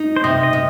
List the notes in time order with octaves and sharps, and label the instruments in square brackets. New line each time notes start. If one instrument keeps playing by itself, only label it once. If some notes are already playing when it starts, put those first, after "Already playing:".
Already playing: [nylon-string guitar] D#4
[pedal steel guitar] C5
[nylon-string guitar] C3 [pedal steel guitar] D#5
[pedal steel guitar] D#5
[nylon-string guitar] C3